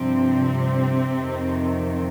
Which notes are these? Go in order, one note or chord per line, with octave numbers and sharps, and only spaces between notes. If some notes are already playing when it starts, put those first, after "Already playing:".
Already playing: G2 C3 F3 C4
F2 D#3